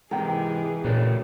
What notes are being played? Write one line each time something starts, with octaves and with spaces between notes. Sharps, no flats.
G#2 C3 E3 G#4 A#4 G5
A#2 C#3 F#3 A3